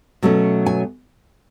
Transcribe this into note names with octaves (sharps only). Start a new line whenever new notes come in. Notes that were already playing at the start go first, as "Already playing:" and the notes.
B2 F#3 A3 C#4
G#5